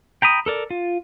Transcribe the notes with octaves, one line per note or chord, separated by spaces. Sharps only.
G5 A#5 B5 D#6
A4 A#4 D5
F4